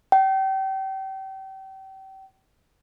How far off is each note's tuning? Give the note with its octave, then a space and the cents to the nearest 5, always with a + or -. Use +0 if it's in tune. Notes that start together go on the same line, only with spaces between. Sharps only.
G5 -35